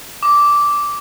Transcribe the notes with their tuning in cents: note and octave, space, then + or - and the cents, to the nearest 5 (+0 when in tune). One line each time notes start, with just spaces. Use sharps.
D6 -10